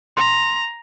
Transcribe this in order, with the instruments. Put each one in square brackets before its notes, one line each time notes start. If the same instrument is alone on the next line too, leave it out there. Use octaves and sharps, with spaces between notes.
[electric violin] A#5 [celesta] C6